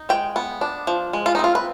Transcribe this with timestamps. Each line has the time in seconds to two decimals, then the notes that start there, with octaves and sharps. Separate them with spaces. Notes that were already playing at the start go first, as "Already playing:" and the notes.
Already playing: D#4
0.09 G#3 G5
0.36 B3
0.61 D4
0.87 F3
1.13 G#3
1.26 F4
1.35 D#4
1.39 C4 F4
1.55 B4